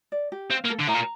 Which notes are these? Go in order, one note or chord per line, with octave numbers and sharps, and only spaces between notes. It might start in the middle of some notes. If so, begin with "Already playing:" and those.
D5
G4
C4 F5
A#3
A4
D3
A2 A#5
A#2